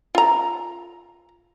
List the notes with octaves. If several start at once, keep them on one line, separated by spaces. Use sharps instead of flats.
F4 A#5